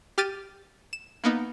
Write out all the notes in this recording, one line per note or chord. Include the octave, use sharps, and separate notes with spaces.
G4 F6 A6 D#7
E7
A#3 B3 D#4